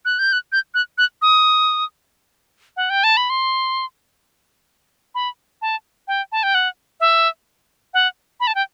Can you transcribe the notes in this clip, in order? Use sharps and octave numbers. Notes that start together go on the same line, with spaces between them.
F#6
G6
F#6
G6
F#6
F#6
D#6
F#5
G5
A5
B5
C6
B5
A5
G5
A5
G5
F#5
E5
F#5
B5
A5
G5